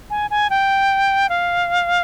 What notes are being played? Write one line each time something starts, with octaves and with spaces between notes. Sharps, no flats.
G#5
G#5
G5
F5